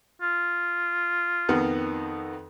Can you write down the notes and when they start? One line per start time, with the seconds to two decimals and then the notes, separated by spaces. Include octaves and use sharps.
0.22 F4
1.49 F2 D#3 B3